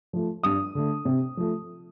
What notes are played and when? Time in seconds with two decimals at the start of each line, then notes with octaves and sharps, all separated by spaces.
0.13 F3 A3
0.43 G2 D#6
0.75 D3 A3
1.05 C3
1.37 F3 A3